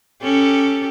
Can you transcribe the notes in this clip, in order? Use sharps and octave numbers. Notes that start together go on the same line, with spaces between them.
C#4 G4 A4